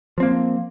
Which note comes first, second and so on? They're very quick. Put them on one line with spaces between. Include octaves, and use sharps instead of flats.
F3 C4 A#3